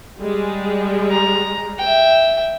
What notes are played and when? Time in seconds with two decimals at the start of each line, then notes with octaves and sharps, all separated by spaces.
0.19 G3 G#3
1.11 A#5
1.79 E5 G5